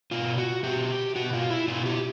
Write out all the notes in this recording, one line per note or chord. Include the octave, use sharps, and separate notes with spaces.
B2 F4
F#4
B2 G4
B2 F#4
F4
E4
B2 F4
G4